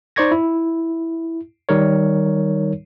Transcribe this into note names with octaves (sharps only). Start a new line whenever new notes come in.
D#4 C5 D5 C#6 G#6 A#6
E4
D#3 G3 D#4 A#4 C#5